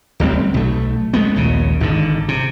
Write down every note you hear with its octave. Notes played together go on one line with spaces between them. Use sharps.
D1 A1 G3 C4
B1 A3
G#3 A3 B3
A#1 D#2 C#3
G#1 G#2 D3
C3